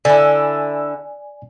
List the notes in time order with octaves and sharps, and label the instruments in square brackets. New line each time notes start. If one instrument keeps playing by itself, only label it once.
[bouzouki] D3 E4 [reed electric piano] D5 G#5